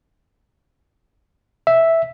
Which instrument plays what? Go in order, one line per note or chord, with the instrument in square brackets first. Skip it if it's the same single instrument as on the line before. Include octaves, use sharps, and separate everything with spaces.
[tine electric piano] E5